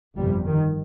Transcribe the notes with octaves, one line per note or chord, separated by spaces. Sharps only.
G1 F2 C3 G3
D#3